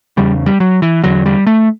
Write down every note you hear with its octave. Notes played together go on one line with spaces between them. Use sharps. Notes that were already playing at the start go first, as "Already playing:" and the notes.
E2 C#3 G3
G3
F#3
E3
E2 D3 F#3
G3
A3